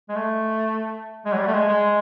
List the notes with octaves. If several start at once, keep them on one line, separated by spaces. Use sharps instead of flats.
G#3
A3
G#3
F#3
G3
A3
G#3
G#3